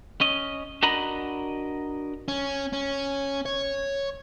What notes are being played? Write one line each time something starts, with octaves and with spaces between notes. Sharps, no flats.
C#4 D#5
D4 F#4 A#4 D#5 A#5 B5
C#4
C#4
C#5